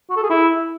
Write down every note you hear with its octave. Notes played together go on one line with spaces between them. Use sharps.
F#4
A4
G#4
E4